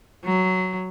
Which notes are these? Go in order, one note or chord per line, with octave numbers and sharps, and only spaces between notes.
F#3